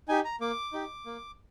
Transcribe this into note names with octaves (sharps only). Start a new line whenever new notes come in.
D#4 G4 G#5
A#5
A#3 D6
D#4 G4
A#3